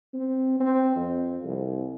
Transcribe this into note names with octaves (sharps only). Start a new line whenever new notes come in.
C4
C4
F2
C2